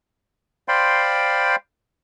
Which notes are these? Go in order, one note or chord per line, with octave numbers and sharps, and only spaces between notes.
C5 D5 F5 G5 B5 C6